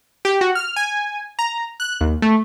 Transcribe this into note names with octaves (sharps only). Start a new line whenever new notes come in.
G4
F#4
F6
G#5
A#5
F#6
D#2
A3